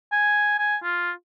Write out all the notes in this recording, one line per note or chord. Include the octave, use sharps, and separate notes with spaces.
G#5
G#5
F4